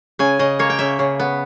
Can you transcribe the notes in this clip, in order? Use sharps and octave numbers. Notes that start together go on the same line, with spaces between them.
C#3 G#5
C#3 D#5
A#3 C#5
G5
C#3 E5
C#3
B3